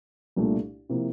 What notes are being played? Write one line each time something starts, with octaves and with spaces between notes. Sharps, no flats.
C2 A#2 A3 D4
C3 F3 A#3 E4